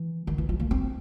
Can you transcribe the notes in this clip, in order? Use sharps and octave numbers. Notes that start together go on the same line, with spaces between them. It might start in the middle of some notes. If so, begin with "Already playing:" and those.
Already playing: E3
D#3
E3
F3
A#3
C4